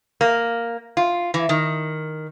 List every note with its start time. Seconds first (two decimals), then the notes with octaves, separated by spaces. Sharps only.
0.21 A#3
0.97 F4
1.34 E3
1.49 D#3